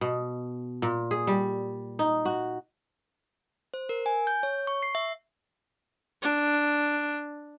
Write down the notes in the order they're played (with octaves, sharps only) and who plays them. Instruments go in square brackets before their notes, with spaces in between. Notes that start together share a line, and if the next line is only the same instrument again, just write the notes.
[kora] B2
A#2
G#4
G3
D#4
F#4
[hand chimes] C5
A#4
G#5
G6
C#5
C#6
C7
E5
[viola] D4